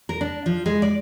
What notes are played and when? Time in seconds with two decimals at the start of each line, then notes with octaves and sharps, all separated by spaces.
0.09 A#4
0.21 D4
0.46 F3
0.66 G#3
0.82 D5